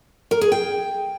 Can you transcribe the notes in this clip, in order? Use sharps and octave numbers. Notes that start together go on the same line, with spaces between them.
A#4
G#4
G5